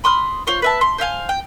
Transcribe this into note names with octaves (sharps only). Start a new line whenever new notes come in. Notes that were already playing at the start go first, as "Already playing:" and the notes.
B5 C6 D#6 F6
F4 C5 C#5
B4 E5 A5
C6
C5 E5 F5 G#5
G5